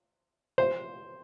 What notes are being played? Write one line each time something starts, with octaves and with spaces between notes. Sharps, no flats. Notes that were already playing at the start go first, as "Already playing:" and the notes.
C5